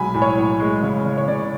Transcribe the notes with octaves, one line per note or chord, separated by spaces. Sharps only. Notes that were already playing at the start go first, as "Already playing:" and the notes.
Already playing: B1 G#3 G#5 B5
A2
C#5
A2
G#3
C#3
C#3
C#5
C#3 D5